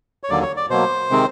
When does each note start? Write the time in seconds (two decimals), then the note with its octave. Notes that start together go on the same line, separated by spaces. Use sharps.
0.23 C#5
0.30 D#2 D3 F#3 A#3 D5
0.43 C#5
0.57 D5
0.70 B2 F#3 A#3 C5
1.10 C3 D#3 G#3 C4